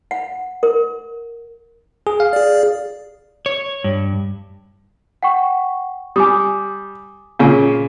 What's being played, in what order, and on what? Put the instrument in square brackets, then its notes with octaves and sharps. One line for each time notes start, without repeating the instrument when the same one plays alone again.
[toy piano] F#5
A#4
[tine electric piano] G#4
F5
[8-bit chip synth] G#4 D5
[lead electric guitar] C#5
G2
[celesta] F#5 G5 C#6
[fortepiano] G3 [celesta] G#5 D6 D#6
[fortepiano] A#2 C#3